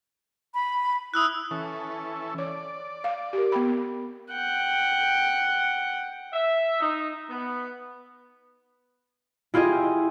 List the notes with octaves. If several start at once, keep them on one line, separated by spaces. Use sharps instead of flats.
B5
E4 D#6 E6 F#6
E3 C#4 A4
C#5 D5
F5
G4 A#4
B3 G5 B5
F#5 G5
E5
D#4
B3
E4 F4 G4 G#4 D#5